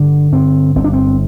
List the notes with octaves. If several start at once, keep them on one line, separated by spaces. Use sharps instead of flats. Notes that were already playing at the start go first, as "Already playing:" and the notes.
Already playing: G1 D3 D4
G2 C4
G1 C4
D4
C4